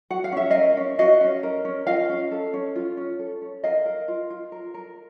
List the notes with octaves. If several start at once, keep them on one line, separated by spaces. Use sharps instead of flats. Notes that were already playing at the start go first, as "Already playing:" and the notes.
F#4 F#5
F5
C#4 E5
A#4 D#5 F5
C#4
F#4 D#5 F5
C#4
A#4
C#4
F4 D#5 F5
C#4
A4
C#4
F4
C#4
A4
C#4
A#4 D#5 F5
A#4
F4
F4
A#4
A#4